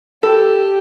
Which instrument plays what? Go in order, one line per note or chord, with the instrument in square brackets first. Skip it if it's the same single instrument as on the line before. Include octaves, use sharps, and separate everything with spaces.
[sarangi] G4 [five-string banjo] A4